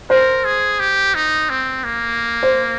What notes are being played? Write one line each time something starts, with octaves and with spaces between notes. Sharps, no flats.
A#4 C5
G#4
G4
D#4
C4
A#3
C5